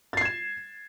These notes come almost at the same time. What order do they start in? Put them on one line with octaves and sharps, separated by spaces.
A6 C7 G#6 E7